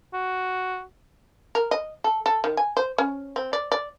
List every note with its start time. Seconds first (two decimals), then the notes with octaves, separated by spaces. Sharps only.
0.14 F#4
1.55 A#4
1.71 D#5
2.04 A4
2.26 A4
2.44 D#3
2.57 G#5
2.77 C5
2.98 C#4
3.36 C4
3.53 D5
3.72 D5